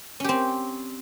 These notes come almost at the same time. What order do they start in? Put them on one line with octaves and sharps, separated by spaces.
C#4 G4 C4